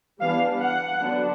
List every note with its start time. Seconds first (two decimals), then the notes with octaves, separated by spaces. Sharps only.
0.21 E3 G3 B3 D4 F5
0.61 F#5
1.01 D3 F#3 B3 D4